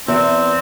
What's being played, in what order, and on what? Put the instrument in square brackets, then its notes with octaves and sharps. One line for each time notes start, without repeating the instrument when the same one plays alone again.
[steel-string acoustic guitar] E2 [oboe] C4